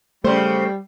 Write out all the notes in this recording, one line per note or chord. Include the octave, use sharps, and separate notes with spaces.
C#3 G3 A3 C5